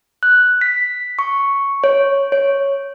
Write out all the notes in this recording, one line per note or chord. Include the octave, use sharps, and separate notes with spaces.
F#6
B6
C#6
C#5
C#5